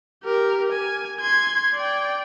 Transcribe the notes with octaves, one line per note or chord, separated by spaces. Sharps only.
G4 A#4
G#5
C6 G#6
D5 G5